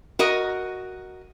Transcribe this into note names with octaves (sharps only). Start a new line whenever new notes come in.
F#4 A#4 D#5